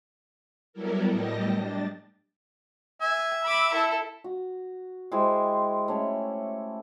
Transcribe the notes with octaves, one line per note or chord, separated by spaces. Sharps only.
F#3 G3 B3 E4 A4 A#4
A2 G3 G4 D#5 A5 A#6
D4 A6
E5 G#5
B5 D6
E4 A4
F#4
G#3 E4 G4 C5
A3 C#4 C#5